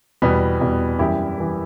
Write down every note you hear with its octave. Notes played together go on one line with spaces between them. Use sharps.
E2 B2 G3 B3
E2 B2 G3
F#2 E3 G3 E4 G4
E3 G3